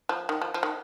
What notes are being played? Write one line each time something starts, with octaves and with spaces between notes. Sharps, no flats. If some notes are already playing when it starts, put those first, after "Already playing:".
F3
D#3
F3
F3
D#3